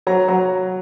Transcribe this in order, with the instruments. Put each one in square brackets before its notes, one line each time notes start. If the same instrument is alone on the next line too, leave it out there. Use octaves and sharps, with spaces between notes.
[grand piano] F#3 A#5
F#3 A#5